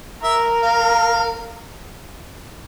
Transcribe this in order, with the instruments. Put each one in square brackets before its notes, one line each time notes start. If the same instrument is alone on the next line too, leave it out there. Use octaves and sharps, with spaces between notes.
[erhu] A#4 [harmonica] E5
[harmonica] F5